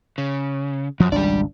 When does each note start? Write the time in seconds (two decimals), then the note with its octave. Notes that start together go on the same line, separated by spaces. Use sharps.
0.18 C#3
1.00 F#2 F3
1.12 G#1 C#2 G3 D4 D5